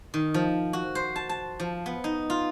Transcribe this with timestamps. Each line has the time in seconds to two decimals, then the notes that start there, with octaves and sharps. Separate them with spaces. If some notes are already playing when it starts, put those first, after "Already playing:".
0.14 D#3
0.34 F3
0.73 F#4
0.95 C5
1.16 A5
1.29 A5
1.60 F3
1.86 B3
2.04 D#4
2.30 F4